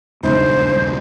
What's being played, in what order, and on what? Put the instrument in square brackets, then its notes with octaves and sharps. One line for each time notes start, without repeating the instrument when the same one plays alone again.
[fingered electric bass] D#1 B1 C#3 [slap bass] E2 G2 [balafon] G#3 D#4 [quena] C5